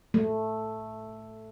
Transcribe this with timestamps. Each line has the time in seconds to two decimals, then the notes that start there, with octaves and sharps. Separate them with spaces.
0.14 A3